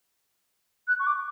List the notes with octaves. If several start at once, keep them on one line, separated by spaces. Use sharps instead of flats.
F#6
C#6
D6